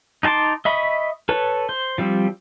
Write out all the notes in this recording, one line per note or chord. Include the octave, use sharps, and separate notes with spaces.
D#4 F#4 A5 C6 D6
D#5 E5 B5 C#6 D#6
A4 B4 C#5
C5
F3 G3 C4